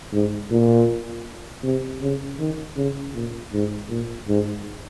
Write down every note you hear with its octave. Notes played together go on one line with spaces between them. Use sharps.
G#2
A#2
C3
C#3
D#3
C#3
A#2
G#2
A#2
G#2